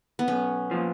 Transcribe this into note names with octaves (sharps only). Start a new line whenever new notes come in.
B3
B1 C#4
A#2 F3